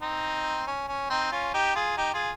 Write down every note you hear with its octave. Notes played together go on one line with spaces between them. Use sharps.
C4 D#4
C#4
C#4
C4 D#4
C#4 F4
D#4 G4
F4 G#4
D#4 G4
F4 G#4